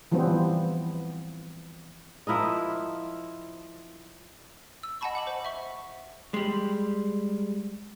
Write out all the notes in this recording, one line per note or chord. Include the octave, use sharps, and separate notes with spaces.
E3 F3 G3 B3 C4
F3 E4 A#4 D#5
E6
D#5 F#5 G#5 A5 B5 C#6
F#5 D6 F#7
C5
E5 C#6
G3 G#3